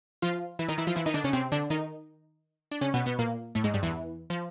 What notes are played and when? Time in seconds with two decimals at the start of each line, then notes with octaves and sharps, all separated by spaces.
0.22 F3 F4
0.59 E3 E4
0.68 D#3 D#4
0.78 E3 E4
0.87 F3 F4
0.96 E3 E4
1.06 D#3 D#4
1.14 D3 D4
1.24 C#3 C#4
1.33 C3 C4
1.52 D3 D4
1.70 D#3 D#4
2.71 D4
2.81 C#3 C#4
2.94 B2 B3
3.06 B2 B3
3.19 A#2 A#3
3.55 A2 A3
3.64 G#2 G#3
3.74 G2 G3
3.83 E2 E3
4.30 F3